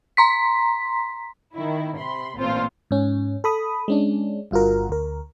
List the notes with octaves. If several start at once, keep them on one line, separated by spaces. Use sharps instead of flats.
A#5 C6 B6
D#3 E4
C3 B5 C6
A1 A#2 C4 F4 A4 C5
G#2 C#4
A4 B5 D#6
G#3 C#4 D4
G1 G2 F4 F#4 A#4
D2 A#4